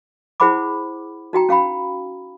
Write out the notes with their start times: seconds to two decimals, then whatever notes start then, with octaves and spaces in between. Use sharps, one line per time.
0.40 E4 G#4 C5 F#5 B5 D6
1.33 D#4 F#4 G5 A#5
1.49 C#4 F5 G5 B5